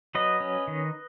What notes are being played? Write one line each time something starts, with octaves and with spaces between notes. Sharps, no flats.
F#3 B4 D#5
C#4
D#3